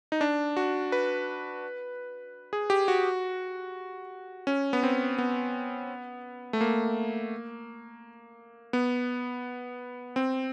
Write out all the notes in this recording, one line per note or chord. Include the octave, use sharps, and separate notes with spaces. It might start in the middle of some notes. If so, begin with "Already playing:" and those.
D#4
D4
F#4
B4
G#4
G4
F#4
C#4
B3
C4
B3
A3
A#3
B3
C4